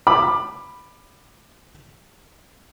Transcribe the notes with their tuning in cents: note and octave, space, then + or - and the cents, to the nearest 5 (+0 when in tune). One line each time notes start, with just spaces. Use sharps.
B5 +0 D6 +20